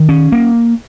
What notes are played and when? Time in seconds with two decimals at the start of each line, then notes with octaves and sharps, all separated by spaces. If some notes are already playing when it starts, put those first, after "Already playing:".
Already playing: D#3
0.09 C#4
0.32 A#3